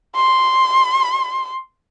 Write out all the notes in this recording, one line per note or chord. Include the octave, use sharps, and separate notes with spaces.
C6